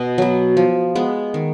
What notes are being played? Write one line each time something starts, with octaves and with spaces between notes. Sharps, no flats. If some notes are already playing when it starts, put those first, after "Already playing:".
Already playing: B2 B4 D#5
F#3 B3
F3
G#3 B3
D#3